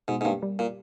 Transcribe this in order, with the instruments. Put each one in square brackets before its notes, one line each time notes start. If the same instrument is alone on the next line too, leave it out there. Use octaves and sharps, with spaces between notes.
[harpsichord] G#2 [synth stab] B2
[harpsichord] G#2
[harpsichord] G2 [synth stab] A#3
[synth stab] G3
[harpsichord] A#2